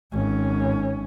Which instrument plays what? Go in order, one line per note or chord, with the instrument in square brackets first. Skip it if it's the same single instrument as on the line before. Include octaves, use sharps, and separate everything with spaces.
[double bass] G#1 C#4